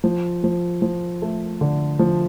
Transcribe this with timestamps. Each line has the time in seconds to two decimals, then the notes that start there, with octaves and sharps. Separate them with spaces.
0.04 F3
0.44 F3
0.82 F3
1.22 A3
1.61 D3
1.99 F3